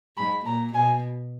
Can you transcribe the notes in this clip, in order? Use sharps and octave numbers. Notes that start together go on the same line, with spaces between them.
G#2 B5
A#2 A#5
B2 G#5